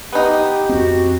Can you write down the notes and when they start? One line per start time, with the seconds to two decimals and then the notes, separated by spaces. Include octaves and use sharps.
0.13 B3 D#4 G4
0.69 F2 C4 F#4